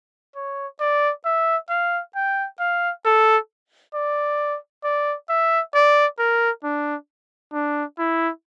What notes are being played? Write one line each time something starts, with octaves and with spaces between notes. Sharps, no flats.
C#5
D5
E5
F5
G5
F5
A4
D5
D5
E5
D5
A#4
D4
D4
E4